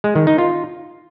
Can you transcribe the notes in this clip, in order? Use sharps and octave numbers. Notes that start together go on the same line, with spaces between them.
G#3
D#3
D#4
F4